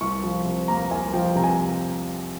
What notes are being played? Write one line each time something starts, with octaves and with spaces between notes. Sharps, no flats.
C2 C#6
F3
C3
A#3 A#5
C2 G#5
F3 G5
C3 A#5
G#5